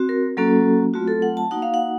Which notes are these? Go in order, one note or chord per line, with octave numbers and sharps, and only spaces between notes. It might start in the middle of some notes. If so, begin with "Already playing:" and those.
Already playing: C4 F#4
A#4
F#3 A#3 C#4 F#4 A4
F#3 A3 C4 F4 F#4
A4
F#5
A5
A#3 D#4 F#4 F#5
F5
F#5